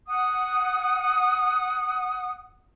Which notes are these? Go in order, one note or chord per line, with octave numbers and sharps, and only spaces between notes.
F#5 D#6